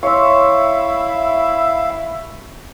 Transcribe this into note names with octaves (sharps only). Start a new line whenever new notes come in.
E4 C#5 E5 F5 C6